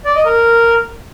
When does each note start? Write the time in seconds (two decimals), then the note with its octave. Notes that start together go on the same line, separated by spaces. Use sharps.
0.05 D5
0.15 D#5
0.26 A#4